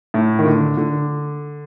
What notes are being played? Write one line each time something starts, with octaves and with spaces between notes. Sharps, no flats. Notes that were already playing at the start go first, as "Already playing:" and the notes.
A2
D#3
D3
D3